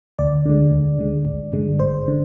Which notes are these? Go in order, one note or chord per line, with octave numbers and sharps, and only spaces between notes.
D2 D5
D3 G#3
D2
D3 G#3
G#1
G2 D3 G#3
G#1 C5
D3